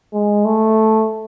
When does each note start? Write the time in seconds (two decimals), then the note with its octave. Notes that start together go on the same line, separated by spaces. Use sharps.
0.13 G#3
0.45 A3